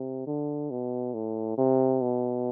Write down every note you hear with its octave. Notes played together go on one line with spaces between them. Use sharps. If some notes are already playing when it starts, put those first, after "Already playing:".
Already playing: C3
D3
B2
A2
C3
B2